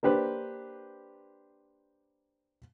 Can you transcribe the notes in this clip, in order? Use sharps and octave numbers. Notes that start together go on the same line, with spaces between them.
A#3 D4 G4 B4 C5